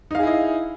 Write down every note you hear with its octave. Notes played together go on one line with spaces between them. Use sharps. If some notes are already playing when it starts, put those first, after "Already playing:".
D#4 E4 G#4 D#5 F5